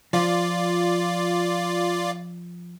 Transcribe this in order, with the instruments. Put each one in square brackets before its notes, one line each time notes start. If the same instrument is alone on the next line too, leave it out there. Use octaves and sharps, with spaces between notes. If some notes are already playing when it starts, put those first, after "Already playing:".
[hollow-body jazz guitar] F3 [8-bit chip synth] F4 D5